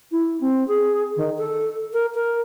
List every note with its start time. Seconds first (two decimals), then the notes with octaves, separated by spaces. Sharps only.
0.12 E4
0.41 C4
0.68 G#4
1.17 D#3
1.38 A4
1.93 A#4
2.15 A#4